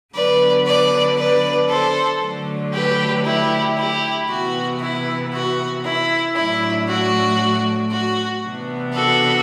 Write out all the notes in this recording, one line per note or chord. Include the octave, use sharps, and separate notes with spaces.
D3 F#3 B3 D4 B4 D5
B4 D5
B4 D5
A4 C5
D3 F#3 A3 D4
G4 B4
E4 G4
E4 G4
C3 E3 B3 F#4
E4
F#4
E4
A2 F#3 A3 D4 E4
F#4
F#4
C3 E3 B3 D4
F#4 A4